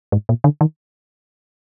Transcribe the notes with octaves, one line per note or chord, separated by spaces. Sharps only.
G#2
A#2
D3
D#3